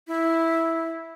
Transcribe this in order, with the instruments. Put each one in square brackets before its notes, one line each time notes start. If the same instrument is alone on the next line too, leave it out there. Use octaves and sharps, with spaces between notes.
[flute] E4